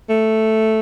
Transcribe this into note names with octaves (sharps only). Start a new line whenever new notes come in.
A3